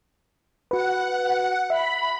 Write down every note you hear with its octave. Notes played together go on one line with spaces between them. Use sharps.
F#4 B4 F#5
E5 B5